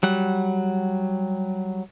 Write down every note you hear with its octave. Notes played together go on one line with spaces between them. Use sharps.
F#3 G3 F#5